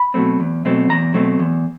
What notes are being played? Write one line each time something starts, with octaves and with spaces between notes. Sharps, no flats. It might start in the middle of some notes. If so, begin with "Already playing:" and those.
Already playing: B5
B2 F#3 A3 C4
E2
B2 F#3 A3 C4
E2 A#5
B2 F#3 A3 C4
E2